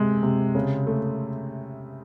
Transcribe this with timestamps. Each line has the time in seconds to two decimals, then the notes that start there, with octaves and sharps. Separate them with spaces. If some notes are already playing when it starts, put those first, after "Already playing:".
Already playing: C3 G#3
0.23 C3
0.55 C#3
0.87 A3